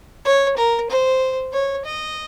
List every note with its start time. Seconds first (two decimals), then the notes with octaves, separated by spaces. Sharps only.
0.25 C#5
0.57 A#4
0.90 C5
1.53 C#5
1.85 D#5